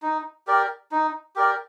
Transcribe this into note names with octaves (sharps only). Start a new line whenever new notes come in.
D#4
G4 A#4 D5
D#4
G4 A#4 D5